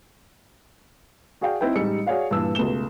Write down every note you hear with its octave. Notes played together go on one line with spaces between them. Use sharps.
F#4 G#4 D5 F5 G5
C4 D#4 E4 B4 G5
A1 G3 G#3 D#4 E6 C#7
F#4 G#4 C#5 D5 F5 F#5
G2 A#2 E3 E6
C#2 B2 A3 E7 G7